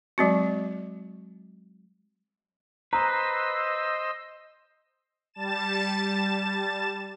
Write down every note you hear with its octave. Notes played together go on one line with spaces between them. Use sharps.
F#3 G#3 C4 F#4
B4 C5 D#5 A#5 E6
G3 A5 A6 E7